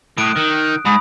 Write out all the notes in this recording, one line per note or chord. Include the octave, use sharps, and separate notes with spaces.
A2 D#6 F#6 D7
D#3
G#2 B5 D#6